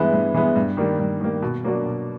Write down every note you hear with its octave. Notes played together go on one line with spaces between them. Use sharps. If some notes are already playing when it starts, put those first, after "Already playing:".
Already playing: G2 E3 G#3 B3 E4
G2
E3 G#3 B3 E4
G2
D#3 G3 A#3
G2
D#3 G3 A#3
B2
F#3 A#3 D4 F#4
B2